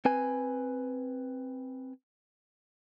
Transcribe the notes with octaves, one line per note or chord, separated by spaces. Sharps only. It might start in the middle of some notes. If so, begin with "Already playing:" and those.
C4 B4 G#5